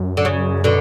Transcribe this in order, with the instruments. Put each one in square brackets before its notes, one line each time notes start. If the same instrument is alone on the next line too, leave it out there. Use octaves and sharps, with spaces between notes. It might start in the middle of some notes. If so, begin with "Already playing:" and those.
Already playing: [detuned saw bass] F#2
[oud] D3
C#3
B2 D3